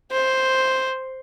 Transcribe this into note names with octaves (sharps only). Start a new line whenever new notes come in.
C5